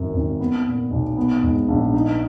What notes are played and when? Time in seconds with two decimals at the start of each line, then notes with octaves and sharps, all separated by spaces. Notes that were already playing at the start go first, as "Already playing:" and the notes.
Already playing: G#1 F#2
0.14 G#1
0.39 B3
0.66 A#2
0.91 B1
1.17 B3
1.43 G#2
1.68 A#1
1.94 D#4